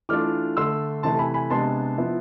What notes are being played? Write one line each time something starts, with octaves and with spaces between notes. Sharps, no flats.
E3 A3 D4 F4 D6 F6
D3 A3 D4 C6 E6
C3 E3 A3 E4 A5 C6
G#5 B5
G#5 B5
C3 G#3 B3 D4 A5 C6
F3 B3 E4